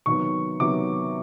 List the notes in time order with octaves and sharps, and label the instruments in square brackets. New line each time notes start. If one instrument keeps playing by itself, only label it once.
[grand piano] C3 D#3 F#3 B3 C#6
C3 D#3 F#3 B3 D6